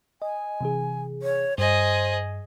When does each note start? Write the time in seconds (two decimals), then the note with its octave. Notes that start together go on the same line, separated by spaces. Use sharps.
0.22 D#5 G#5
0.61 C3 E3 G#4
1.22 C#5
1.58 G2 G#4 C5 D#5